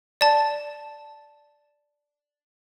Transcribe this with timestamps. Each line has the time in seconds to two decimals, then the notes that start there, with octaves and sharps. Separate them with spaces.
0.21 D5 A5